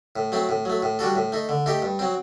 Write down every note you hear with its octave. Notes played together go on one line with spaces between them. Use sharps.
A2
F#3 A3 C4
A2
F#3 A3
A2
G3 D4 F#4 A4
A2
A3 D#4
D3
A3 D#4 G4
G2
F#3 C4